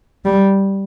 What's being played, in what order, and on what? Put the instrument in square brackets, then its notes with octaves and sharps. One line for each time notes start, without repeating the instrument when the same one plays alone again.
[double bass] G3